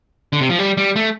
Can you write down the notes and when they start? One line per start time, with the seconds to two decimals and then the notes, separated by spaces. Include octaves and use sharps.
0.33 D3
0.41 C3
0.50 F3
0.59 G3
0.77 G3
0.96 A3